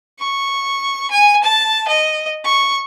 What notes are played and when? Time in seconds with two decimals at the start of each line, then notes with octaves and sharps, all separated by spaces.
0.19 C#6
1.11 G#5
1.44 A5
1.88 D#5
2.45 C#6